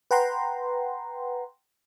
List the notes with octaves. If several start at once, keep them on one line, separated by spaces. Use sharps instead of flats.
B4 F#5 G5 A#5 C6